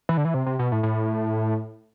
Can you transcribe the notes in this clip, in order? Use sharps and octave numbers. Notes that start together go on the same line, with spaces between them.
E3
D3
E3
C3
C3
B2
A2
A2